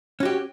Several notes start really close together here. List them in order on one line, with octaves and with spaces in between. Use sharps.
C#4 F#4 G4